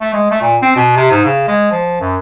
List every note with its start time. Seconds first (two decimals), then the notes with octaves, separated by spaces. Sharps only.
0.01 A3
0.14 G#3
0.31 A3
0.42 A#2
0.62 C4
0.76 B2
0.97 C3
1.11 G#2
1.25 C#3
1.48 G#3
1.71 F3
2.01 F#2